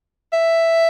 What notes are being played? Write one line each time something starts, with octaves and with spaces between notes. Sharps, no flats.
E5